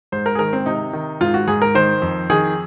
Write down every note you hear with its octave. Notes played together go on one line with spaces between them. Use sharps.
G#2 C5
A#4
G#4
D#3 A#4
C4
C3 D#4
D#3
G#2 F4
F#4
G#2 G#4
A#4
D#3 C5
F2
D#3 G#4